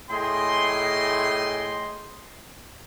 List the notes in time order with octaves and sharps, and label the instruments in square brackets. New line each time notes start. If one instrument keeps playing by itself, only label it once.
[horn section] A2 G#4 D#5 G5 C6